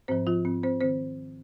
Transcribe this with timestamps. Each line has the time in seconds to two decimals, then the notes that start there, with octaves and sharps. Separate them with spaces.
0.08 G#2 F3 C4 C5
0.27 F3 F4
0.45 G#2 F3 C4
0.63 C4 C5
0.81 D#3 C4 C5